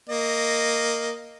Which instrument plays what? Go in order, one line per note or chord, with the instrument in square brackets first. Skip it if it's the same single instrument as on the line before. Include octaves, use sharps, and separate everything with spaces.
[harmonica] A#3 D#5